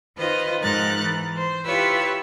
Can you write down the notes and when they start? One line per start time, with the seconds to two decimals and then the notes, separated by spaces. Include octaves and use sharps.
0.17 D#3 F4 B4 C5 D#5
0.61 G#2 F3 D#4 A#4 F#6 A6
1.01 E3
1.35 C5
1.65 E4 F4 G4 B4 C#5 E6